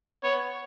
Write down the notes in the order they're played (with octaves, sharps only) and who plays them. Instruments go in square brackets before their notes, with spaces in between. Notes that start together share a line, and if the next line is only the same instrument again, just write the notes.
[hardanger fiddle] B3 [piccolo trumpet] C#5